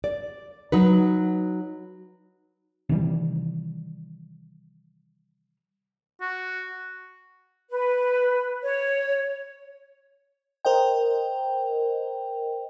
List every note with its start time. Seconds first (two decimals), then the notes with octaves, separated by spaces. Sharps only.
0.04 D5
0.72 F#3 D#4 B4
2.89 C3 D#3 E3 G3
6.21 F#4
7.71 B4
8.63 C#5
10.65 A#4 C5 D#5 G5